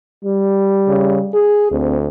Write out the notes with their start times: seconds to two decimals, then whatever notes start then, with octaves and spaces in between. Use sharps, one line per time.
0.25 G3
0.88 C#3
1.34 G#4
1.72 D2 C4